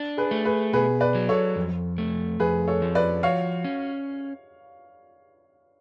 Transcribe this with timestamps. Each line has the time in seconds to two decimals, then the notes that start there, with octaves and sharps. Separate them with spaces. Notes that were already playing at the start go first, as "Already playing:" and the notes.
Already playing: D4
0.17 G#4 B4
0.31 A3
0.45 G#4 B4
0.73 B2 G#4 B4
1.01 B4 D5
1.15 F#3
1.29 A4 C#5
1.56 F2
1.98 A3
2.40 F2 G#4 B4
2.68 A4 C#5
2.82 F3
2.95 B4 D5
3.23 F#4 C#5 F5
3.64 C#4